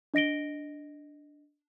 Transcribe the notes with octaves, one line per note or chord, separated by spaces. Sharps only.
D4 D#5 A#6 D7 G7